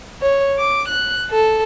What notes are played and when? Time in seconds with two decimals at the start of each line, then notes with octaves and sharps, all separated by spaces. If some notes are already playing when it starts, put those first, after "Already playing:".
0.21 C#5
0.58 D6
0.87 F#6
1.28 A4